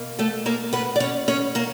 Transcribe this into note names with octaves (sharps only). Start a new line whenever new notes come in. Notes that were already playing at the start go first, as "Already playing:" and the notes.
Already playing: B2 A#3
A3 A4
A#3 A#4
B3 B4
D5
C#4 C#5
C#4 C#5
A#3 A#4